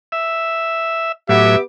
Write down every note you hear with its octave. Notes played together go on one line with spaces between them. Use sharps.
E5
A2 F#3 B3 G4 E5 D6